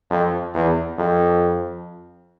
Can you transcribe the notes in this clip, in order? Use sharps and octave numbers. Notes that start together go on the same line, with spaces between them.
F2
E2
F2